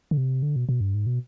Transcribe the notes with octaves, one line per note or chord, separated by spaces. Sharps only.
D3
C3
D3
B2
B2
G2
G#2
B2